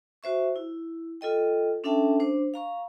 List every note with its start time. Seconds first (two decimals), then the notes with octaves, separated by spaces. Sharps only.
0.23 F#4 C5 E5 C#6
0.56 E4
1.21 F4 A4 D#5 G5
1.84 C#4 D4 A4 E5 G5 A5
2.20 D4 C5
2.54 F5 A#5 C#6